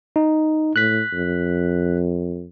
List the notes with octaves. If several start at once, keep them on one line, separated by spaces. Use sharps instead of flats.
D#4
A2 F#6 B6
F2